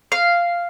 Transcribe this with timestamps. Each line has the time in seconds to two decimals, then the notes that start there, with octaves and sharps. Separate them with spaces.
0.12 F5